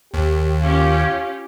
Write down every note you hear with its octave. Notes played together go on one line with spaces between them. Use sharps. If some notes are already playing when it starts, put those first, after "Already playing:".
D#2 G4
C#4 F4 G4 F5